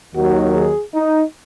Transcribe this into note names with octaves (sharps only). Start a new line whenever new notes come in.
D#2 D#3 F#3 F#4
G#4
D#4